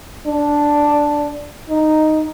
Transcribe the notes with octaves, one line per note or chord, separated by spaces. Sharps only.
D4
D#4